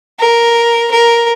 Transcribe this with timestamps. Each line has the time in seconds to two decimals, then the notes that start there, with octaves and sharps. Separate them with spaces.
0.20 A#4
0.91 A#4